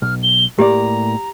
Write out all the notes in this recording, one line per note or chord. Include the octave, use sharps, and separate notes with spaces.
B1 F6
G7
A2 A#3 G4 D5 A#5